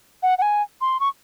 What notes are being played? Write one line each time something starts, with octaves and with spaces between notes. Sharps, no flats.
F#5
F#5
G#5
C6
C#6